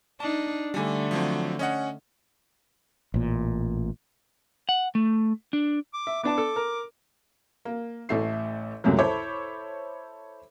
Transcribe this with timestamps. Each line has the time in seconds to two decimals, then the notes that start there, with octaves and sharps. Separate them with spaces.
0.20 D4 D#4 A5
0.74 D3 G3 A3 G#5
1.11 F3 F#3 C4
1.59 C#4 D#5 F#5
3.14 A1 A#2
4.69 F#5
4.95 A3
5.53 D4
5.93 D6
6.07 E5
6.23 B3 D4 A5 D6
6.38 A4
6.56 A#4
7.65 A#3
8.09 A1 E3 A3 E5 C7
8.84 C#2 F#2 A2 C3 F#3
8.99 E4 A4 C5 C#5 B5 D6